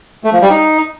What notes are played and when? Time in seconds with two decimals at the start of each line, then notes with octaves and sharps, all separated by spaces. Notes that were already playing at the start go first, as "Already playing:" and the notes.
0.24 A3
0.33 F3
0.42 G3
0.50 D#4